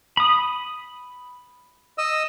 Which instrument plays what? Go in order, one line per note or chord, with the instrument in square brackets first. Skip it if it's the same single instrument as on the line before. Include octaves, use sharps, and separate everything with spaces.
[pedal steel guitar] B5 D#6
[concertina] D#5 E6